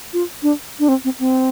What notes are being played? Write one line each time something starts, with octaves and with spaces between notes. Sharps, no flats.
F4
D4
D4
C4
C4
C4